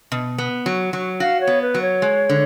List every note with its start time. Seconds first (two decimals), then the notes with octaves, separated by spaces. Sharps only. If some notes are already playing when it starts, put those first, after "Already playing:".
0.12 B2
0.38 B3
0.66 F#3
0.93 F#3
1.20 F#4 F5
1.41 C#5
1.47 B3
1.62 B4
1.74 F#3
1.82 C#5
2.02 G#3
2.30 D3